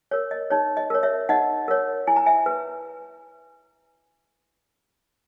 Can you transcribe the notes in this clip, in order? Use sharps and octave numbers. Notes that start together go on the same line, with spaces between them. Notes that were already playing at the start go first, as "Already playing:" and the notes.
A#4 C#5
D#5
D#4 C#5
D#5
A#4 C#5
C#5 E5
D#4 D#5 F#5
A#4 C#5
E4 G#5
A#5
E5 G#5
B4